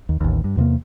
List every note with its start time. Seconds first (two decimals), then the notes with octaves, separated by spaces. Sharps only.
0.09 D#2
0.21 A1 D#2
0.44 G2
0.57 E2 C3 G3 A#3